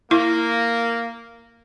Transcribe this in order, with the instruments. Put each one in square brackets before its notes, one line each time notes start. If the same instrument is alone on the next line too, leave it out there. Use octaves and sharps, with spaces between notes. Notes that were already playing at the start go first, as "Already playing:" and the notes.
[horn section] A#3 [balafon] E4